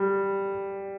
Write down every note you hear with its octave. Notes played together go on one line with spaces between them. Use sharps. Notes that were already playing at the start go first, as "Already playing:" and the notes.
Already playing: G3